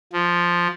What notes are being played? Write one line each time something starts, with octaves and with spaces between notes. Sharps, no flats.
F3